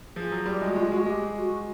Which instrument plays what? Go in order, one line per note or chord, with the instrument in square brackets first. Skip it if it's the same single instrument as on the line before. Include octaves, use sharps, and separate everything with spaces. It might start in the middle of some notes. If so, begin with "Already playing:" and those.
[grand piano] F3 [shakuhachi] G#4
[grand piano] F#3
[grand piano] G3 [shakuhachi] G4
[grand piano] G#3
[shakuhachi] F#4
[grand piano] G#3 [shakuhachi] F4
[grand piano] G#3 [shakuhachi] F#4
[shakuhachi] G#4
[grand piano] G#3 [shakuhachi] G4
[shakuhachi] F#4